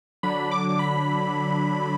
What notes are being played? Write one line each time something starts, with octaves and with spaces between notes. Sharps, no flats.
D3 F#3 D4 B5
D6
D6
B5